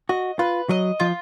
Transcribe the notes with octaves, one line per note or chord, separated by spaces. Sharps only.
F#4 D#5
F4 B4
F#3 D#5
F3 F4